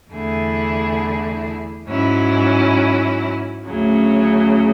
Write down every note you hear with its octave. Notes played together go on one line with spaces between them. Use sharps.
E2 D3 A3 E4 G#4
G#2 F#3 C#4 E4
D2 C#3 F#3 C#4